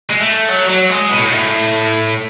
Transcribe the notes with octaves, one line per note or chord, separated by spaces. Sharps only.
G#3
A3
F#3
F#3
G#3
B2
A2
G#2
A2